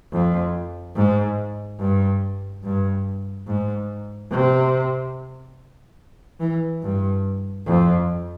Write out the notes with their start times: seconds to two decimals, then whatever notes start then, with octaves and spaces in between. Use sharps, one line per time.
0.12 F2
0.96 G#2
1.79 G2
2.63 G2
3.47 G#2
4.31 C3
6.40 E3
6.82 G2
7.66 F2